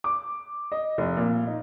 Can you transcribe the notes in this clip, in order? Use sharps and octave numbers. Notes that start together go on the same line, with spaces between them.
D6
D#5
F1
A#2
D#4